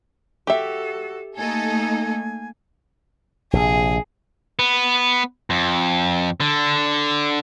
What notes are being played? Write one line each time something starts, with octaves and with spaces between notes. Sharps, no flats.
F#4 G4 A4 E5
A3 A#3 D#4 A4 G#5
A#1 C3 G#4
B3
F2
D3